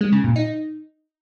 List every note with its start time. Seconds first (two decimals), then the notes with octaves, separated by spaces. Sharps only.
0.01 G#3
0.12 C#3
0.24 A#2
0.36 D#4